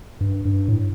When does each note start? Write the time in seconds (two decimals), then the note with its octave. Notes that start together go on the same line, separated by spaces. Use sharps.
0.21 G2
0.45 G2
0.68 A2